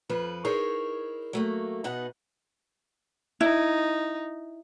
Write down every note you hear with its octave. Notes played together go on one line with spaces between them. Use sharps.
F2 F3 B4
D#4 E4 G#4 A#4 C5 C#5
F#3 A3 A#3
B2 B3 D#4 F#5
D#4 E4